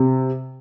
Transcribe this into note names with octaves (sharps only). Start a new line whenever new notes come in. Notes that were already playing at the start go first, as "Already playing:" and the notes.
Already playing: C3